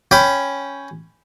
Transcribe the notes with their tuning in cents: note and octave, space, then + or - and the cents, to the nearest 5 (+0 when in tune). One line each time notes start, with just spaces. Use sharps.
C#4 +0 G5 +0 B5 +10